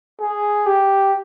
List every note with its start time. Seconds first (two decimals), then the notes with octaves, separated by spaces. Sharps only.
0.20 G#4
0.66 G4